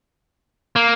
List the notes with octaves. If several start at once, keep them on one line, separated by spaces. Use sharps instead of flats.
A#3